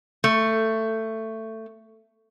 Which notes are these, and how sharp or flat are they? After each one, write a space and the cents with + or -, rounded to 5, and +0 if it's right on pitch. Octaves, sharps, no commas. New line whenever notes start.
A3 +15